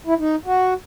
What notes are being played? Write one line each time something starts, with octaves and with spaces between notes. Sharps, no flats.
E4
D#4
F#4